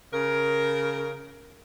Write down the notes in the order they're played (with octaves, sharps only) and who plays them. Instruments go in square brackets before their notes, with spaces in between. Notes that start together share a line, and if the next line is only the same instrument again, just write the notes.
[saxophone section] C#3 A#4